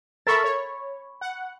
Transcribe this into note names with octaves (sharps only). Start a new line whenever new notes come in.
A4 A#4 E5 B5 C#6 A6
C#5
F#5